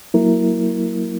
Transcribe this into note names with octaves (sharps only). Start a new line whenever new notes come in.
F#3 A#3 E4 A#4